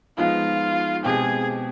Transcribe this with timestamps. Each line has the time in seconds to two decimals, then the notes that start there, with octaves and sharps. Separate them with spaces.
0.18 F3 G#3 B3 D#4 F4
1.04 B2 G#3 C4 G4 G#4